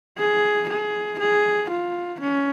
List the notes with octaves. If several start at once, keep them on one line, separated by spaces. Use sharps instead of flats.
G#4
G#4
G#4
F4
C#4